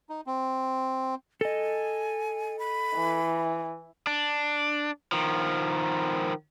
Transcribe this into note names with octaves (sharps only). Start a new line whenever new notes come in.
D#4
C4
A4 D#5 G#5
B5
E3
D4
D#3 F3